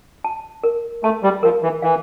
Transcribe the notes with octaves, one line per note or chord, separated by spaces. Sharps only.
A5
A#4
A3 A5
G3
F3 A#4
E3
E3 F5